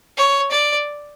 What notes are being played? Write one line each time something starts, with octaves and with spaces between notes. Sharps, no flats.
C#5
D5